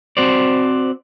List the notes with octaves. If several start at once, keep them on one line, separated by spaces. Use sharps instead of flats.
C4 F#4 C5 D5